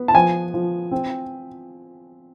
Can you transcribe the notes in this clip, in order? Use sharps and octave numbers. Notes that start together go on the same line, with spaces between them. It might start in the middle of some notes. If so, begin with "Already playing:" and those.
Already playing: B3
A5
F3 G#5
F3
C4